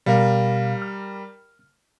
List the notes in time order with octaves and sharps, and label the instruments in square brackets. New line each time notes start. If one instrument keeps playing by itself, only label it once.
[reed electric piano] B2 F5 [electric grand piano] G3 A#4
[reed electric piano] F6